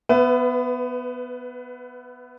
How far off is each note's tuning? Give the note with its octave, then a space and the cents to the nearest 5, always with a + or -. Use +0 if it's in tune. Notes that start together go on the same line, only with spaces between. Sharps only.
B3 +0 B4 +25 E5 +25